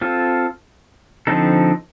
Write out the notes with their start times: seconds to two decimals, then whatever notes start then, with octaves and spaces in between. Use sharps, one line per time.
0.01 C4 F4 A4
1.27 D3 F3 C4 D#4 A4